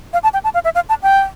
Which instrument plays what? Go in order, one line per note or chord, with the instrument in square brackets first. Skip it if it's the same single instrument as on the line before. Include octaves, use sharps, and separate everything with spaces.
[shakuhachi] F5
A5
G5
A5
F5
E5
F5
A5
G5